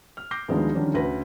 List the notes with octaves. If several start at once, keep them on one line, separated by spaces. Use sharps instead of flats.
F6
D6 G6 A#6 C7
D2 D#3 F3 G#3 B3 D4
D3 D#3 F3 G3 C#4 D4
D2 C#3 B4 A#6